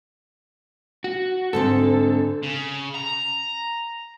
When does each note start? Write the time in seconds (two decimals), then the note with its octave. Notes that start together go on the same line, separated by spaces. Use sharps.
1.04 F#4
1.53 G#2 D3 C4 A4
2.43 C#3
2.95 A#5